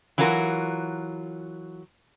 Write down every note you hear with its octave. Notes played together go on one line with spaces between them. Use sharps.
E3 F#3 F4 F#4 A#4